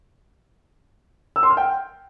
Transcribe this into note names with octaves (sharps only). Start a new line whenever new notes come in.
E6
C6
F6
G5